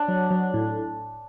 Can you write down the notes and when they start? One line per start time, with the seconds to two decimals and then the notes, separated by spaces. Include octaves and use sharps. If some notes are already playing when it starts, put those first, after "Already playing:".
Already playing: D4
0.08 F#3
0.30 F#3
0.54 A2